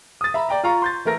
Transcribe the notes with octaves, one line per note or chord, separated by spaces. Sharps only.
D#6 A6
E5 A#5 B5
D5 G5 A#5
F4 F5 A#5 C#6
C6 G6 A6
E3 A3 A#4 A#6